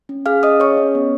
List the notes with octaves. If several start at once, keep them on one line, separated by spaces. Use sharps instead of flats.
C#4
G#4 F5 F6
C#4 D#5 D#6
G#4 C#5 C#6
C#4
B3